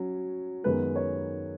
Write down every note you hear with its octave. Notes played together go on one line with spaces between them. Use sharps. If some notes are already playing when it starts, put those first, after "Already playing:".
Already playing: F#3 C#4
F#2 D#3 G#3 B3 B4
C#5